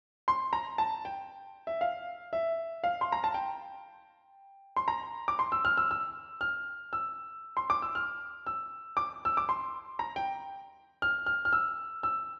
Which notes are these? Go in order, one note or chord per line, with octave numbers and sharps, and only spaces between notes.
C6
A#5
A5
G5
E5
F5
E5
F5
C6
A#5
A5
G5
C6
A#5
D6
C6
E6
F6
E6
E6
F6
E6
C6
D6
E6
F6
E6
D6
E6
D6
C6
A#5
G5
F6
F6
F6
E6
E6